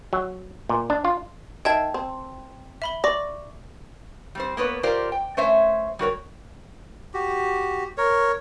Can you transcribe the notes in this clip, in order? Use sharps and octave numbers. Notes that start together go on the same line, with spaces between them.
F#3
A#2
D4
F4
D#3 E5 G5 A5 G#6
C4
E5 B5 G7
D5 C#6 D6 A#6
G3 C4 C5
A#3 B3 B4 C#5
F4 G4 A#4 C5 D5
G5
A3 C#4 C5 C#5 E5
G3 F#4 A#4 C#5
F#4 G4
A#4 C#5